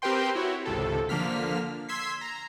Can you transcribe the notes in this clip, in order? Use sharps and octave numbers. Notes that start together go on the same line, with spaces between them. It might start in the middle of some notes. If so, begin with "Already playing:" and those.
C4 G4 A#4 B4 G5 C6
E4 F#4 C#5
G#1 C#2 C3 A4
D3 F3 A#3 F6 B6
C6 E6 G#6 B6 C7
A#5